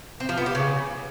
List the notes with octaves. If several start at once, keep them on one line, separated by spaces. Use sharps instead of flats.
C4
F3
B3
G4
C#3